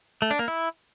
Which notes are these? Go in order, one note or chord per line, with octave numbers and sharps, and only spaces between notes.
A3
D4
A#3
E4